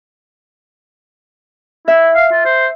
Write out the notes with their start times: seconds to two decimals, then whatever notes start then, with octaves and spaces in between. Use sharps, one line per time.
1.88 E4 E5
2.15 F5
2.32 F4
2.45 C5